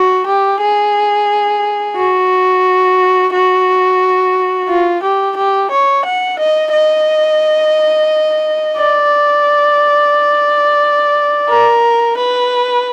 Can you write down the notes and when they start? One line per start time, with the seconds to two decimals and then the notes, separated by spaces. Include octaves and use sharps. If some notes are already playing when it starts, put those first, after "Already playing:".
Already playing: F#4
0.27 G4
0.60 G#4
1.97 F#4
3.33 F#4
4.69 F4
5.03 G4
5.37 G4
5.71 C#5
6.05 F#5
6.39 D#5
6.73 D#5
8.77 D5
11.49 A#4
12.17 B4